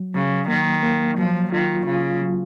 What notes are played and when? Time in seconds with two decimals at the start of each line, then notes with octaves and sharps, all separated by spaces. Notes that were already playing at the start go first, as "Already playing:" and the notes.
Already playing: F#3
0.15 C#3 F#3
0.48 D#3 A#3
0.83 A#3
1.18 F3 F#3
1.52 D#3 F4
1.86 C#3 F4
2.22 F#3